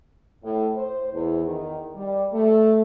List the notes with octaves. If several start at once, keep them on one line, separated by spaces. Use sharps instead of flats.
A2
C5
E2
D#3
G3
A3